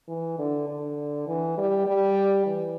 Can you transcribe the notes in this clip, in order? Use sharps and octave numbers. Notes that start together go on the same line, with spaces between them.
E3
D3
D3
E3
G3
G3
E3